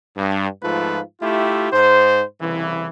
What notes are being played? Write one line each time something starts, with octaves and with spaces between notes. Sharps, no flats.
G2
G#2 F3 A3 F4 B4
A3 E4 F4 G4
G#2 C5
C2 C#3 E3